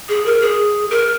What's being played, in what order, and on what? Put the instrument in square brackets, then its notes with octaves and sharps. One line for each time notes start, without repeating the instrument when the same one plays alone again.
[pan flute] G#4
A#4
G#4
A#4